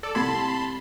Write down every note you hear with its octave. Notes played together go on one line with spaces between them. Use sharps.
A4 D5
C2 A5 B5 C6 G#6